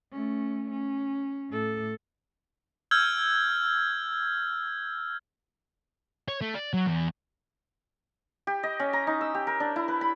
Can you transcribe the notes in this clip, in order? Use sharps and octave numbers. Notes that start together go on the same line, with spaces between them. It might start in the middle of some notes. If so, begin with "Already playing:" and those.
A3 C#4
C#4
A2 A4
E6 F6 G6 G#6
C#5
A3
D5
F#3
E2
G4
D#5
C#4
A#5
D#4
E6
G4
A#4
D4
E4
B4
B5